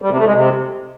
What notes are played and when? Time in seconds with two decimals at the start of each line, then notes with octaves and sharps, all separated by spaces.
0.02 G3
0.10 C3
0.18 A3
0.26 G#3
0.34 C3